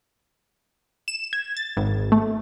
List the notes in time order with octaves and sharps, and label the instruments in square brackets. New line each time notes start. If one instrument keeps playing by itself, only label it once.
[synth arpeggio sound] E7
G#6
A6
G#1
A3